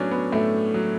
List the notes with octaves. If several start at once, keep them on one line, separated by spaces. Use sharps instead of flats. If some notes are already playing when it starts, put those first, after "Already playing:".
Already playing: A2 F#3 B3 C#4 D4
B3
A2 A3
F#3